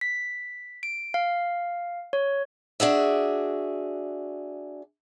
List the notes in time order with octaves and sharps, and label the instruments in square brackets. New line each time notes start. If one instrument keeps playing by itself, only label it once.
[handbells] B6
D7
F5
C#5
[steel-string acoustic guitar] D4 F#4 G#4 E5